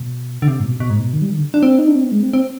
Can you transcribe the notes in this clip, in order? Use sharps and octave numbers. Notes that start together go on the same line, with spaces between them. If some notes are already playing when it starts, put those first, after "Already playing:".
Already playing: B2
D3
C3
G#2
B2
B2
G#2
B2
D#3
G3
D#3
D3
D4
C4
D#4
D4
C4
B3
G#3
C4
C4